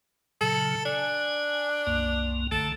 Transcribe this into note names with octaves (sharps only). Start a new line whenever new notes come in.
A#2 C#3 F#3 A4
D4 G#5
C2 F#2 A#3
A#1 D3 A3 A4